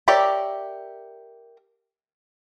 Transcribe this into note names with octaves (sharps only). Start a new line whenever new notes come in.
G4 A#4 C#5 D5 E5